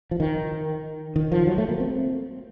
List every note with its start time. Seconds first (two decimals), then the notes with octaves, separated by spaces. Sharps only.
0.11 F3
0.20 D#3
1.16 D#3
1.32 F3
1.47 F#3
1.58 A3
1.69 A#3
1.80 C4